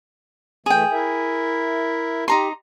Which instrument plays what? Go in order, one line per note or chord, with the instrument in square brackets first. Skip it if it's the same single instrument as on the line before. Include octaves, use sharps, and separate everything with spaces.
[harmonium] E3 A3 [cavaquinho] G#4 G5
[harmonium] E4 A#4 E5
[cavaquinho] D#4 A#5 C6 [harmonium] G4